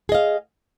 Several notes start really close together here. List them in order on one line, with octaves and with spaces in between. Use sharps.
G#4 D#5 F5